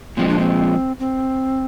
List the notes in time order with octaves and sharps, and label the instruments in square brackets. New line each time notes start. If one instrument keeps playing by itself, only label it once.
[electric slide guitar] A#2 F3 G#3 [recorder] C4
[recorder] D4
C4
C4